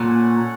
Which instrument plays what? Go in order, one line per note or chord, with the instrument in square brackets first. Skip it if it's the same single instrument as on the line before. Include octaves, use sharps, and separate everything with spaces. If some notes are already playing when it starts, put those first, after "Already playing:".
Already playing: [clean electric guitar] A#2 [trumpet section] C#4 A4 C#5 F#5